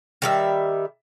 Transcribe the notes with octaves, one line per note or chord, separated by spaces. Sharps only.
D#3 G3 E5